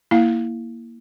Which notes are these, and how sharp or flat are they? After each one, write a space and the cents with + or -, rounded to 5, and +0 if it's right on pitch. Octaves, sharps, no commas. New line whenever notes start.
A#3 +0 E4 +0 F5 +0